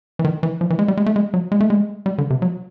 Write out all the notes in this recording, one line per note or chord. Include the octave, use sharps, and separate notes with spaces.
E3
D#3
E3
F3
E3
G#3
G3
G#3
A3
G#3
F#3
G#3
A3
G#3
G3
D3
C3
F#3